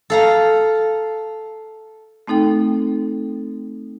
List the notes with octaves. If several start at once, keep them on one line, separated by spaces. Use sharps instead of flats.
A4 F5 A#5
A3 C4 D#4 A4 G5